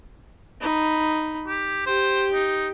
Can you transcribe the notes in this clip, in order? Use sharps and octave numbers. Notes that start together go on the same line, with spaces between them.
D#4 B5
G4
G4 C5
D#4